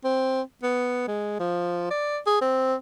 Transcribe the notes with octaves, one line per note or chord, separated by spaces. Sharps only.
C4
B3
G#3
F3
D5
G#4
C4